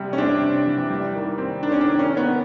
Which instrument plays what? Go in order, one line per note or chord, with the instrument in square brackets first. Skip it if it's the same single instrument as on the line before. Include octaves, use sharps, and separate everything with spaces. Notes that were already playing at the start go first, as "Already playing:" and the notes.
Already playing: [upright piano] C3 G3
[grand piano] C#4
[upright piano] C4 [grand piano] D4
[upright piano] C3
E3
G3
D#3
C4
[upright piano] D#3 [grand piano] D4
[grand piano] C#4
D4
[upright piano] D#3
[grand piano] C#4
[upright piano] D#3
[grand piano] B3